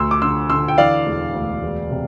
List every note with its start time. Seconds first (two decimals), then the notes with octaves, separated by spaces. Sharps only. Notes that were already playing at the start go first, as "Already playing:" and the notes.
Already playing: D2 C6 E6
0.11 D6
0.22 D3 C6 E6
0.50 D3 C6 E6
0.68 G5
0.78 E3 D5 F5
1.06 E1
1.34 D2
1.62 E1
1.91 C3